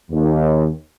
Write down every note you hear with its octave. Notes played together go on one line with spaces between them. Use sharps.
D#2